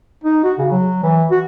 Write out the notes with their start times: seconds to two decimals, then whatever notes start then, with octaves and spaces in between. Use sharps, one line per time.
0.24 D#4
0.44 F#4
0.58 C#3
0.72 F#3
1.03 E3
1.31 F#4